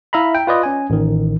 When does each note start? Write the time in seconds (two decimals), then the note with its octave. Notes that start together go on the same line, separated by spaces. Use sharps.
0.13 E4 E5 F5 A#5 B5
0.35 G5
0.47 F4 B4 D5 D#5
0.63 C#4 G#5
0.90 A1 D#3